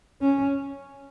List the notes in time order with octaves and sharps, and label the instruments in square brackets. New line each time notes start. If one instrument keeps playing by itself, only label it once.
[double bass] C#4